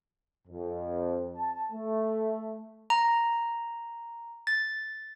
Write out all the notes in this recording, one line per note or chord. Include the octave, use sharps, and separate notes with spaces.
F2
A5
A3
A#5
A6